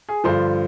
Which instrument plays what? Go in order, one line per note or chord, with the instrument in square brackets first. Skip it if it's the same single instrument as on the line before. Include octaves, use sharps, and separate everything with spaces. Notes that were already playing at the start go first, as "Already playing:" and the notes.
[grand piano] G#4
G2 D3 F3 C5